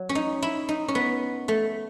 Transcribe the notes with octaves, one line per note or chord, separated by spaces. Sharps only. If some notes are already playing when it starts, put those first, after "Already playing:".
Already playing: F#3
C#4
D#4
E4
D#4
C#4
B3
A3